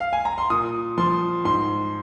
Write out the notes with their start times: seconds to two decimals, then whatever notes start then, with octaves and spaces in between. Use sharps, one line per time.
0.00 F5
0.13 G#5
0.25 A#5
0.38 C6
0.50 A#2 D#6
0.98 F3 C6
1.45 G#2 C6